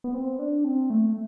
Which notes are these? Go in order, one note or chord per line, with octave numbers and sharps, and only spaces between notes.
B3
C4
D4
C4
A3